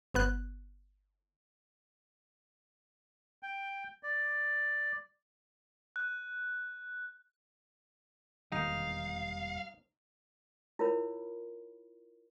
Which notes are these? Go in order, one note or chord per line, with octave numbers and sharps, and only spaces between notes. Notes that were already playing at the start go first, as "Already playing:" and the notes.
G1 B3 F#6
G5
D5
F#6
E1 F2 D#3 G3 A#3 D#4 F5
E4 F4 A#4 C#5 B5